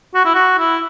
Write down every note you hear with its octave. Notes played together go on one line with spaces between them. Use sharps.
F#4
E4
F#4
E4